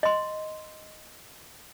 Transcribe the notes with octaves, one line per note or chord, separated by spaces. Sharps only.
D#5 C6